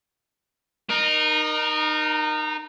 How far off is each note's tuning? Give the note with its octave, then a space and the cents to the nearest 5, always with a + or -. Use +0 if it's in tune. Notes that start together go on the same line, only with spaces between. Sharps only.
D#4 -25 A#4 +20